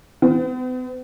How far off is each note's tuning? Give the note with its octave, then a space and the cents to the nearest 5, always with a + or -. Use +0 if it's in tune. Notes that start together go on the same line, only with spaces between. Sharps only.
B3 +45